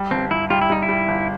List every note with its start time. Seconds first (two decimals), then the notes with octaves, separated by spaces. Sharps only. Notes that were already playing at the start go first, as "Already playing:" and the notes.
Already playing: G3
0.11 G1 C4
0.31 G1 E4
0.50 G3 F4
0.62 E4
0.70 G3 D#4
0.82 E4
0.89 G3
1.08 G1